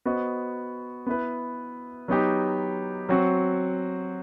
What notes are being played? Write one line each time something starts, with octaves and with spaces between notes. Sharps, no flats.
B3 F#4 C5 D#5
B3 E4 B4
F#3 B3 D#4 G4
F#3 C4 F#4